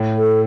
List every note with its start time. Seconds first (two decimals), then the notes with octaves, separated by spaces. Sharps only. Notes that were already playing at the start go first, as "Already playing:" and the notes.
Already playing: A2
0.17 A4